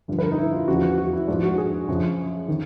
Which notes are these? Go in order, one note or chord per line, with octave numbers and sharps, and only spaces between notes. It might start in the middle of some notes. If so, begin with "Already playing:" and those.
G2 D3 F3
B4
A#4
D#4
E4
F4
E2 C#3 F3 F#4
F#4
F#4
E4
G#2 F3 D4
F#4
G#4
F#2 C#3 F3
D#3